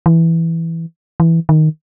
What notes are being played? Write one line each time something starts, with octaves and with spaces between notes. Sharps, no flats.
E3
E3
D#3